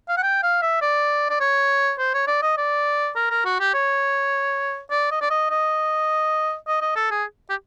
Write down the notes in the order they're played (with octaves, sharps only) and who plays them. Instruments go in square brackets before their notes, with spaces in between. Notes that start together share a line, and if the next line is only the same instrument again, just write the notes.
[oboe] F5
F#5
G5
F5
E5
D5
D5
C#5
C5
C#5
D5
D#5
D5
A#4
A#4
F#4
G4
C#5
D5
D#5
D5
D#5
D#5
D#5
D#5
A4
G#4
G4